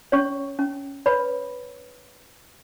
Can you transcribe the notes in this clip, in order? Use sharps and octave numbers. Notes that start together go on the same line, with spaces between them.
C#4 C#5 C#6
C#4
B4 C#5 B5